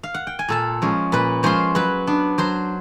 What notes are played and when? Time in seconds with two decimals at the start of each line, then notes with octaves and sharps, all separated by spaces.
0.03 F5
0.14 F#5
0.27 G5
0.39 G#5
0.49 A#2 A4 A5
0.82 F3 G#3 C#4
1.12 A#2 B4 B5
1.43 F3 G#3 C#4 C5 C6
1.75 F#3 B4 B5
2.07 B3 D4
2.38 F#3 C5 C6